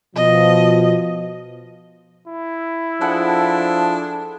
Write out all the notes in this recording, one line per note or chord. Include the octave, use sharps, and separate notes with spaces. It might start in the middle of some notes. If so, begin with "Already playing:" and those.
B2 F3 D#5
E4
F3 D4 G#4 A4 F#5